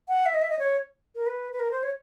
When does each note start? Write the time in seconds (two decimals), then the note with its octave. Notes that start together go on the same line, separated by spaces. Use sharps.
0.08 F#5
0.26 E5
0.34 D#5
0.42 E5
0.50 D#5
0.59 C#5
1.15 A#4
1.27 B4
1.53 B4
1.60 A#4
1.71 C5
1.83 C#5